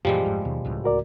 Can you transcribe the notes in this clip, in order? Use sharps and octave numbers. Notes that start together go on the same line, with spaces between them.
F#2 A#2 E3 F3 G3 G#3 G4
F1 G#2
D#2 B2
D1 C#2 A2
F#4 A#4 D5